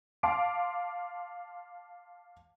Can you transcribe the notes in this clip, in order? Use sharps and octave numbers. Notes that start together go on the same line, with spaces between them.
F5 A5 C6 D6 D7